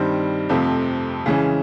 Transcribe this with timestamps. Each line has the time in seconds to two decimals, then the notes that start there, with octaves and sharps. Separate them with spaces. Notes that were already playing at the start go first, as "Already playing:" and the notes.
Already playing: G2 D#3 G3 C4
0.49 F2 C3 F3 A3
1.26 C#3 E3 G#3 C#4